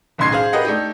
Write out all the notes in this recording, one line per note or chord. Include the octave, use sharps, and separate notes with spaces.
F#1 B1 A2 C6 G#6 C7
G#4 C5 F5
G4 A#4 B4 D#5 F#5
A3 D4 D#4 G4